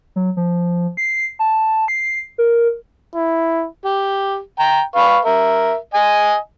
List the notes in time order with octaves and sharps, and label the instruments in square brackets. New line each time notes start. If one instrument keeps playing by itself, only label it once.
[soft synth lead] F#3
F3
C7
A5
C7
A#4
[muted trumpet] E4
[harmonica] G4
G5 A#5
B4 F5 C#6
A#4 E5
D#5 G#5